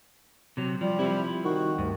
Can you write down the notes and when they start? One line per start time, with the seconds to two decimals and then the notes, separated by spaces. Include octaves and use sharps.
0.57 C3 F#3
0.81 F3 G3
0.99 C3 F3 E4
1.44 D#3 F#4
1.78 D2 G2